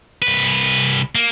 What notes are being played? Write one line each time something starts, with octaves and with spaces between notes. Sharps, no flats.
C2 B4
A#3